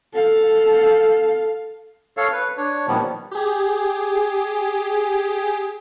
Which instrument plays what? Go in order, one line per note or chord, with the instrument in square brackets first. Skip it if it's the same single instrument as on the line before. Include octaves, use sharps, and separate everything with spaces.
[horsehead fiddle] A4 F5
[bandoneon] A4 C#5 F5
B4
D4 C#5
A#2 D#3 F3 G3 B3
[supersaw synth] G4 G#4